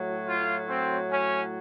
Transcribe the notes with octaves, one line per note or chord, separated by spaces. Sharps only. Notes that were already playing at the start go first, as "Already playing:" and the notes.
Already playing: A2 F#3
F4
C4
C#4